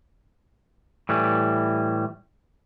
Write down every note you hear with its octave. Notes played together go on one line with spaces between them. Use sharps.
A2 E3 G3